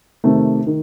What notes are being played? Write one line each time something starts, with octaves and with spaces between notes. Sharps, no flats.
C3 D#3 A3
D#3